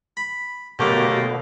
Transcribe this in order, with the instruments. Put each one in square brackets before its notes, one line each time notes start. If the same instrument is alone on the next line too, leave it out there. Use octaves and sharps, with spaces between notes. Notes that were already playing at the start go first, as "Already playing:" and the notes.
[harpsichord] B5
[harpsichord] F#2 D3 D#3 [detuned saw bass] B2 [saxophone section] A3 A#3 G4